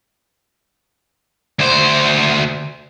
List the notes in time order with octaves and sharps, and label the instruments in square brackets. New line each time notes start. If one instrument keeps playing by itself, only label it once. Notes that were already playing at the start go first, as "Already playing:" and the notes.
[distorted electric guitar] D2 C5